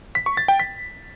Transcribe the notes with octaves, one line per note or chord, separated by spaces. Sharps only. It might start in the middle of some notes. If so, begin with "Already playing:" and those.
B6
C#6
A6
G5
B6